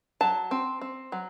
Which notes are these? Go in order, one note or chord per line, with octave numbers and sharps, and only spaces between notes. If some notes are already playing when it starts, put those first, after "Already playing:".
F#3 A5
C4
C4
F#3